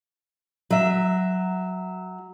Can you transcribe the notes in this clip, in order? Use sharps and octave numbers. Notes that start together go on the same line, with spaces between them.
F#3 E5